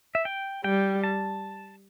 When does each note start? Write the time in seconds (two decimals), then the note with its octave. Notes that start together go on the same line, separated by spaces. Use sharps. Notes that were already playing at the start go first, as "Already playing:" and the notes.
0.15 E5
0.25 G5
0.64 G3 G5
1.04 A5